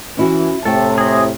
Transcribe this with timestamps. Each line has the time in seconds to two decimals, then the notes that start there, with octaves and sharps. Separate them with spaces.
0.17 E3 C#4 E4 F#4
0.65 A2 C3 A3 A4 F#5 G5
0.98 G#4 D#5